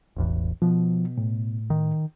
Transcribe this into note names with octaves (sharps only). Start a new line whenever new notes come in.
E1 A1 E2
B2 F3
A2
D#3